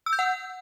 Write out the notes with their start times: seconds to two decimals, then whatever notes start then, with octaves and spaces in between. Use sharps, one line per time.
0.06 E6
0.13 G6
0.19 F#5